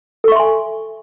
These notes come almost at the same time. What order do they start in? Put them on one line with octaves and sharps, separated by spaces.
A4 C#6 E5 C6 G#5